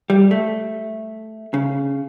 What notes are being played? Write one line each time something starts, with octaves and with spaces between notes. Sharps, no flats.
G3
A3
C#3